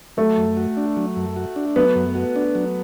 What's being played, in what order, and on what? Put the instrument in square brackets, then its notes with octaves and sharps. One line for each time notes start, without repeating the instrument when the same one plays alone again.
[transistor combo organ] F#3 [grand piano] A3 A4
[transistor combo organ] F#2
F#4
D4
F#3
F#2
F#4
D4
[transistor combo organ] F#3 [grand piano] B3 B4
[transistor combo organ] F#2
F#4
D4
F#3